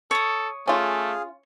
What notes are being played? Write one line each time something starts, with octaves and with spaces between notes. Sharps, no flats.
A4 C#5 D#6
A3 C#4 F4 G#4 F5